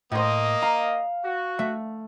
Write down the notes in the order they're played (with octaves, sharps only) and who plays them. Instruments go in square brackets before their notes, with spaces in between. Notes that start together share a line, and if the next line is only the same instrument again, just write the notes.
[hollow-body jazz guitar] A2 C5 [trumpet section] A#3 D#5
[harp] F5 [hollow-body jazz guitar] A#5
[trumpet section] F#4
[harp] A3 [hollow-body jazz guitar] E5